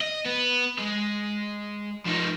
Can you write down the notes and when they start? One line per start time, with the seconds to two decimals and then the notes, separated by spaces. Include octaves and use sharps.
0.01 D#5
0.25 B3
0.78 G#3
2.05 F3 D#4